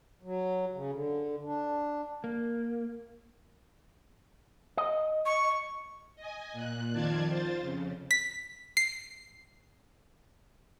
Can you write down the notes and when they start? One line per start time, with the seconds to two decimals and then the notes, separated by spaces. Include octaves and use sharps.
0.23 F#3
0.74 C#3
0.92 D3
1.44 D4
2.24 A#3
4.77 D#5
5.26 C#6
6.16 D#5 G#5
6.53 A#2 F#6
6.93 F2 D#3 F4 D5 A5 G#6
7.28 F4 C5 A6
7.61 F2 C#3
8.11 B6
8.77 C7